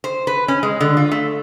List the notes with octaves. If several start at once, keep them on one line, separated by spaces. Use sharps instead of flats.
C5
B4
C#4
G#3
D3
F4
A3